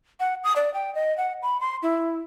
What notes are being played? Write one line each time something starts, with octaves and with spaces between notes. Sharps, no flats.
F#5
D#6
D5
G5
D#5
F#5
B5
C6
E4